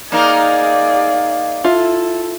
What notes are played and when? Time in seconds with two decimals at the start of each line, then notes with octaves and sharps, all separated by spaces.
0.12 A#3 D#4 G#4 A#4 D5 F5
1.64 E4 F4 A4 E5